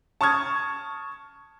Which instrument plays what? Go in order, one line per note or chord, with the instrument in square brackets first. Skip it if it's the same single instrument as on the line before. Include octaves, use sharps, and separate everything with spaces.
[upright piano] A5 C#6 D#6 F6 G#6